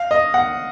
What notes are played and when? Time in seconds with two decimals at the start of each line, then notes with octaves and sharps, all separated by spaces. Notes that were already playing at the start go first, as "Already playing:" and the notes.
Already playing: F5
0.11 D#5
0.34 F#5